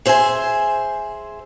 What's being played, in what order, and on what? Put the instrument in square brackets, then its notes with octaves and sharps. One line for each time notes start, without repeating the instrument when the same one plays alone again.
[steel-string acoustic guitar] G#4 C5 E5 G5 G#5